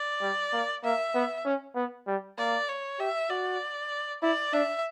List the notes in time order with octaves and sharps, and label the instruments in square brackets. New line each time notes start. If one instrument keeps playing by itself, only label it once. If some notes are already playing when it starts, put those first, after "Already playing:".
Already playing: [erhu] D5
[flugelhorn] G3
A#3
[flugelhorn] A#3 [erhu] E5
[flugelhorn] B3
C#4
B3
G3
[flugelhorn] A#3 [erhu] D5
[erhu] C#5
[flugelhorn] G4 [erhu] E5
[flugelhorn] F#4 [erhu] D5
[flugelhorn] E4 [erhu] D5
[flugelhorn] D4 [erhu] E5